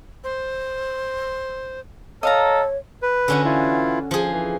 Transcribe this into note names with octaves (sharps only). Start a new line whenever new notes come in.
C5
A4 C#5 D#5 F5 A#5
B4
D3 C#4 F#4
E3 E4 F4
F3 G#4
E3